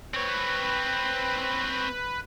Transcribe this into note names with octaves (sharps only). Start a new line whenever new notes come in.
C4 B4 C#5